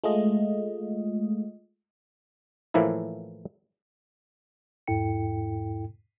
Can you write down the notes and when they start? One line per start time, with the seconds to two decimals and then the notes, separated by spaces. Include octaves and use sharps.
0.04 G#3 A3 F4 D#5
2.74 A2 E3 F3 A#3 E4
4.87 E2 G#2 E4 A4 G5 C#7